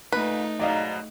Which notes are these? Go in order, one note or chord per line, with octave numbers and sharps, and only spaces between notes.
A#2 A3 D#4 B4
G#2 B2 F#3 D5 D#5 F5